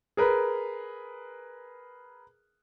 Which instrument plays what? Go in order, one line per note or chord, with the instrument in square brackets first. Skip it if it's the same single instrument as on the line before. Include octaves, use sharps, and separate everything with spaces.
[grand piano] G#4 A#4 B4